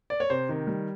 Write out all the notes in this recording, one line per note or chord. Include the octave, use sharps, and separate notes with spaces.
D5
C#5
C3 C5
D#3
G3